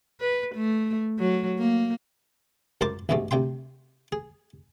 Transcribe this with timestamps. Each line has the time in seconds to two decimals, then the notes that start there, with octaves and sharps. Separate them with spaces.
0.20 B4
0.55 A3
1.19 F#3
1.59 A#3
2.81 C#2 F#2 A#4 C5 A5 D6
3.09 A1 D2 G2 B2 G#3 A3
3.31 D2 C3 G5 C6
4.12 G#4